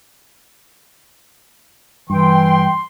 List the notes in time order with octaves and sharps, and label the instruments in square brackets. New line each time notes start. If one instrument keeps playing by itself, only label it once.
[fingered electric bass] G2 [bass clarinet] E3 [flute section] G5 [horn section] C6